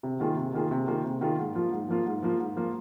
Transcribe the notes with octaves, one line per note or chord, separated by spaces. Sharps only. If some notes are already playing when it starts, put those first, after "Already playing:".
C3
D#3 A#3 F4 G#4
C3
D#3 A#3 F4 G#4
C3
D#3 A#3 F4 G#4
C3
D#3 A#3 F4 G#4
G#2
F3 A#3 F4
G#2
F3 A#3 F4
G#2
F3 A#3 F4
G#2
F3 A#3 F4